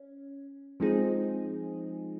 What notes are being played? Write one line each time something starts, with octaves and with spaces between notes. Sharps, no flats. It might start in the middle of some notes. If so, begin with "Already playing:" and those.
Already playing: C#4
F3 G#3 C4 D#4 G#4